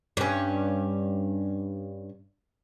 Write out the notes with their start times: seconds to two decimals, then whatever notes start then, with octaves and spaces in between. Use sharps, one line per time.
0.17 G2 C#4